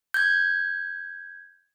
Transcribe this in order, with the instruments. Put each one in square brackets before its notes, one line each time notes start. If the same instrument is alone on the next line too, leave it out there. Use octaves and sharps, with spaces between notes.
[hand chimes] G6 G#6